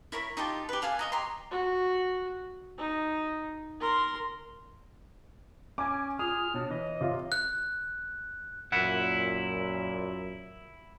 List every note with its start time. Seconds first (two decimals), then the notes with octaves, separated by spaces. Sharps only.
0.12 E4 A#4 C#5 B5
0.37 D#4 F4 G4 A5
0.69 G4 B4
0.82 A4 F5 F#5 G#5
0.99 C#5 D#5 A#5
1.12 G4 A#5 C6
1.51 F#4
2.78 D#4
3.80 A#4 C6
5.78 C#4 G#5 D6
6.19 F4 G#4 D#6 F6
6.54 B2 D4 C#5
6.71 E3 D#5
7.01 C3 F4
7.32 F#6
8.72 F#2 A#2 E4 F#5